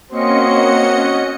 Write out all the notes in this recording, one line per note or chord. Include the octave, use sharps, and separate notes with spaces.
A#3 C4 C#4 F#4 C#5 D#5 C#7